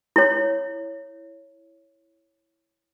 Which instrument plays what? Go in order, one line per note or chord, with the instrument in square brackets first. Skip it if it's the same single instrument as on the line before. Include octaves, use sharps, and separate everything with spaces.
[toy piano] E4 C#5